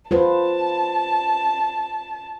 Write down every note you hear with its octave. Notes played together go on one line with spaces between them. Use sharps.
F4 B4 C5 A5